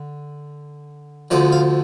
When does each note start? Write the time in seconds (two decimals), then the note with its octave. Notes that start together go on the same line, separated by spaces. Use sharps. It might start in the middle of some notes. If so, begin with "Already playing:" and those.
Already playing: D3
1.31 D2 D3 F3 D5
1.52 F5